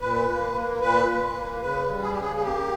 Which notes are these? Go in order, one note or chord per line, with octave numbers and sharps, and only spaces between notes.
A#2 B4
A#3
A#3
A#2 B4
A#2
A#3
C#3 B4
G3
G#4
G4
C#3 G#4
G#4
A#3 G4